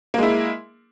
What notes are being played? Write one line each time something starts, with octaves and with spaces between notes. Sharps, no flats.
G#3 A#3 E4